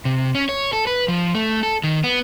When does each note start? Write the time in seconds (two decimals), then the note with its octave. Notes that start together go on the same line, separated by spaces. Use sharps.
0.05 C3
0.35 C#4
0.49 C#5
0.73 A4
0.87 B4
1.08 F3
1.35 A3
1.63 A4
1.84 D#3
2.04 B3